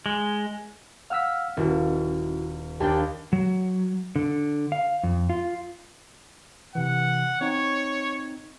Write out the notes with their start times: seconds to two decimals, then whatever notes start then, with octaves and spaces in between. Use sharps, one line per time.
0.06 G#3
1.10 F5 F#5 E6 F6 B6
1.57 D#1 C#4 E4 F#4
2.80 D#2 D4 G4 G5 A5
3.33 F#3
4.16 D3
4.72 F5
5.03 F2
5.30 F4
6.75 C3 E3 F#5
7.41 C4 D#4 C#5